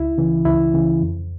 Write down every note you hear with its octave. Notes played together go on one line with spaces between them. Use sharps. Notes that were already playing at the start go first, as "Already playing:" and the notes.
Already playing: C#2 E4
C#3 E3
C#2 E4
C#3 E3
F2